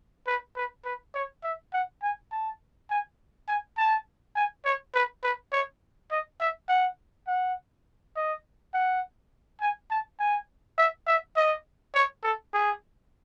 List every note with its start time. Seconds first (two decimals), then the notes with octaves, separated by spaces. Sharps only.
0.27 B4
0.56 B4
0.85 B4
1.14 C#5
1.44 E5
1.73 F#5
2.02 G#5
2.32 A5
2.90 G#5
3.48 G#5
3.77 A5
4.35 G#5
4.65 C#5
4.94 B4
5.23 B4
5.52 C#5
6.11 D#5
6.40 E5
6.69 F#5
7.27 F#5
8.16 D#5
8.74 F#5
9.61 G#5
9.90 A5
10.19 G#5
10.78 E5
11.07 E5
11.36 D#5
11.95 C#5
12.23 A4
12.53 G#4